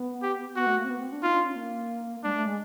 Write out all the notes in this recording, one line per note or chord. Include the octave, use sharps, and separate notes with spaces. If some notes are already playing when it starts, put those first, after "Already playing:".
Already playing: B3
G4
B3 F#4
A3
A#3
C4
B3
C4
D4
D#4 F4
D4
C#4
A#3
G#3 D4
A3
G#3